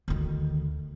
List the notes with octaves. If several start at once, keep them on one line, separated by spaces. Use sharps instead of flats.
D2 D#3